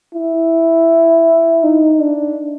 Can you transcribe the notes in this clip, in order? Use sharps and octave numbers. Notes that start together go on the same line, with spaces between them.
E4
D#4
D4